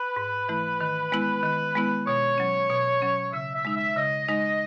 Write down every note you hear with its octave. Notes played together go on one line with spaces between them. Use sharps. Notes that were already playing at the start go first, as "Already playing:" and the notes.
Already playing: B4
G#2
E3 A3 E4
D#3
G#3 B3 E4
D#3
G#3 B3 E4
B2 C#5
F#3 C#4
B2
F#3 C#4
C#3 E5
E5
G#3 D#4
E5
C#3 D#5
G#3 D#4